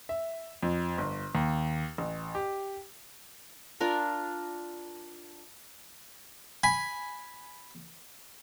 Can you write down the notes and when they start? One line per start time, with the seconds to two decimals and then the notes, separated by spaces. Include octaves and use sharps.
0.09 E5
0.63 F2
0.98 G1
1.35 D#2
1.98 A1
2.35 G4
3.80 D4 F4 A#4
6.64 G#5 B5